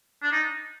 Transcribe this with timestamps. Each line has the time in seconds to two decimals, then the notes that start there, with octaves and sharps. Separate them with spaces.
0.23 D4
0.32 D#4